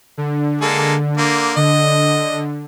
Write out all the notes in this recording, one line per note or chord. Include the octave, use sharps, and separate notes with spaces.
D3
G#3 A#3 A4
D3 A#3
D3 D#5